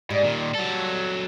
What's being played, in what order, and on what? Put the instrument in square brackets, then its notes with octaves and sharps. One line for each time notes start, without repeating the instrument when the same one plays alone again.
[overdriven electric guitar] G#2 [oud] G3
[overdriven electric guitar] A#2 D#3
F#3 A4